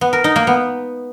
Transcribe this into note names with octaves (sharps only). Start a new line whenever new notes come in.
B3
A#4
D#4
A#3
B3